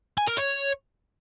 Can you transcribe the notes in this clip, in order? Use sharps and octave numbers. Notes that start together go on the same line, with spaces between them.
G#5
A#4
C#5